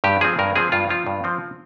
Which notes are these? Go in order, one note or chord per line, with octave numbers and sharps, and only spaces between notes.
G2 G4
F3 C4 G#4
G2 A#4
F3 C4 G#4
G2 F4
F3 C4 F4
G2
F3 C4